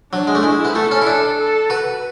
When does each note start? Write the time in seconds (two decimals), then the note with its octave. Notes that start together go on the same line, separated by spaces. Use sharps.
0.12 F#3 D4
0.27 G#3
0.35 A3
0.43 G#3 E4
0.65 B3
0.75 A3 A4
0.91 C#4
1.02 E4
1.07 D4 A4
1.38 A4
1.70 F#4 B4